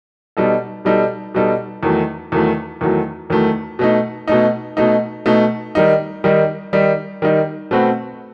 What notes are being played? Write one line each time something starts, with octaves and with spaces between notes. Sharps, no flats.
B2 G3 D#4 A4
B2 G3 D#4 A4
B2 G3 D#4 A4
E2 D#3 F#3 A3
E2 D#3 F#3 A3
E2 D#3 F#3 A3
E2 D#3 F#3 A3
B2 A3 D#4
B2 A3 D#4
B2 A3 D#4
B2 A3 D#4
D#3 G3 D#4
D#3 G3 D#4
D#3 G3 D#4
D#3 G3 D#4
B2 A3 C4 F#4 B4